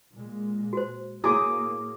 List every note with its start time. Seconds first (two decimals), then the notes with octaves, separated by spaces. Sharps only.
0.14 A#2 G#3
0.73 F#4 C5
1.24 A2 A#3 E4 F#4 G#4 C#5 D6 D#6